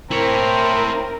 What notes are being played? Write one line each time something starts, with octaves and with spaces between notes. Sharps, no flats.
C4 E4 A#4 C#5